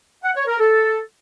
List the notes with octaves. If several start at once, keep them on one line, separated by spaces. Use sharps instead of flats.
F#5
C#5
A#4
A4